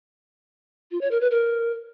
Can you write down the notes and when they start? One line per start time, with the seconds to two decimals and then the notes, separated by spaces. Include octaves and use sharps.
0.91 F4
1.01 C#5
1.11 A#4
1.21 B4
1.31 A#4